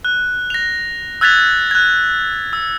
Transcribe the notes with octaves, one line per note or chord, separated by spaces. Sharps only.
F#6
A#6 F7
E6 F#6 G#6 A6 B6 F7
F#6 G#6
E6